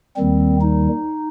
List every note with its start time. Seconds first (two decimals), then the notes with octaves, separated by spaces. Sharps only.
0.16 D#2 D#3 G3 C4
0.61 D#4